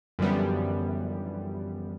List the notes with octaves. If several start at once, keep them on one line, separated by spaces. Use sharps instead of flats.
F#2 D3 E3 F3 G3 B3